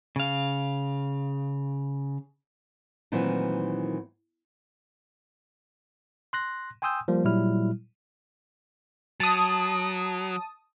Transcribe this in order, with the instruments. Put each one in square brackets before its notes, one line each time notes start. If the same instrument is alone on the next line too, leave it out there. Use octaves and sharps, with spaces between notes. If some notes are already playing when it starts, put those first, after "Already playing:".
[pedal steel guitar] C#3 F5
[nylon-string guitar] A#2 D#3 E3 F#3 A3 C4
[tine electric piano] C6 F#6 A#6
G5 G#5 C6 D#6 E6 G6
F3 G3 A#3
A#2 F#3 G3 E4 F6
[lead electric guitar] F#3 [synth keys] A5 D#6